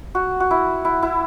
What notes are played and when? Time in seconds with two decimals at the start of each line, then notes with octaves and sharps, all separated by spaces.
0.15 F#4
0.40 F#4
0.51 E4
0.85 E4
1.03 E4